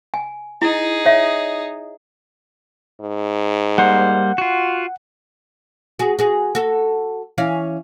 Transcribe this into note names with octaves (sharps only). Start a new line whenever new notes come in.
G#5
D#4 E4 G#4
C#5 E5
G#2
G3 A#3 C5 F#5
F4 F#4
F#4 G#4
F#4 G#4
F#4 A4
E3 C#4 F5